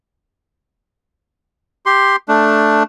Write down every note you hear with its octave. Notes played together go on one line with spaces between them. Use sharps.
G4 C6
A3 D4